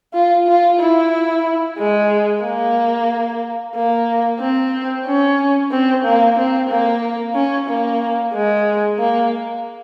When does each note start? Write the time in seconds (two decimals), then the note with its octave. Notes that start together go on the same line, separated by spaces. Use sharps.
0.14 F4
0.47 F4
0.80 E4
1.78 G#3
2.43 A#3
3.75 A#3
4.40 C4
5.06 C#4
5.71 C4
6.05 A#3
6.38 C4
6.70 A#3
7.35 C#4
7.68 A#3
8.34 G#3
8.99 A#3